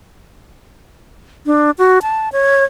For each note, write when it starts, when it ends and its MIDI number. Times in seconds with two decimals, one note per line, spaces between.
1.46 1.71 62
1.78 1.99 66
2.02 2.29 81
2.32 2.64 73